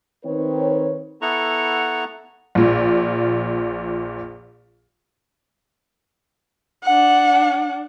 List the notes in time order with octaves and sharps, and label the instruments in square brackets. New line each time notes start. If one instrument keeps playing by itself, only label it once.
[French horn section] D#3 C4 D#4 B4 C#5
[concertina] B3 E4 A4 F#5 A#5 C#6
[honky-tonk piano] A#1 A#2
[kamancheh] D4 F#5